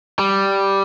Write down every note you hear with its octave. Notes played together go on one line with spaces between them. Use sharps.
G3